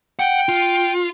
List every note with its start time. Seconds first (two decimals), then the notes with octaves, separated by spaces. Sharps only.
0.19 F#5 G5
0.49 F4